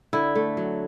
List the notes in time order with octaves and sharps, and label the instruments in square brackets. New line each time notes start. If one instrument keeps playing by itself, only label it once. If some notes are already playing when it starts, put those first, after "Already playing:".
[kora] D3 E4
A3
F#3